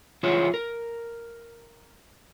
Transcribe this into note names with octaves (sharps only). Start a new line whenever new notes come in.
E3 F4 G#4 C5 C#5
A#4